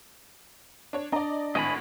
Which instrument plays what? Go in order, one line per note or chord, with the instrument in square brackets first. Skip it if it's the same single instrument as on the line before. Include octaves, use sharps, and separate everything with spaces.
[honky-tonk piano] D4 C#5
[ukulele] D4 A#5 [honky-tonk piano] D5 D#5
[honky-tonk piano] G#1 A2 [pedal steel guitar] D#5 G#5 B5